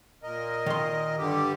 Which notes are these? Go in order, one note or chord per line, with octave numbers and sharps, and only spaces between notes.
A#2 A#4 D#5
D#3 C6
G2 D3 G4